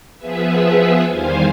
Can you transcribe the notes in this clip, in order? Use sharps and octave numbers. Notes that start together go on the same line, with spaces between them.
F3 B3 G#4 B4 E5
E2 D#3 G3 C5 F5 G#5